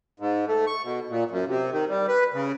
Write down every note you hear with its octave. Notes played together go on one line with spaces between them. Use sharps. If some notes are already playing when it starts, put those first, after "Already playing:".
G#2
A3
C#6
B2
A#2
F#2
C3
D#3
G3
B4
C#3